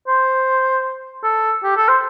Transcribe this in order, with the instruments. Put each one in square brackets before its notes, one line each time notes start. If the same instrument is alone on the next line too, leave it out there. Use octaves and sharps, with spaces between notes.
[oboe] C5
A4
G4
A4
C5